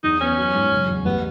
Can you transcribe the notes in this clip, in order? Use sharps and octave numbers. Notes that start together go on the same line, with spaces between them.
E2 D#4
B3 C#4
F#3
G#2
F#1
E2
A1 B3